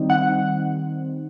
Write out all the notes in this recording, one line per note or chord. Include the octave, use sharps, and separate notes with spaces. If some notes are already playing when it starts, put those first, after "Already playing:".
Already playing: D#3 G3 C4 D#4
F#5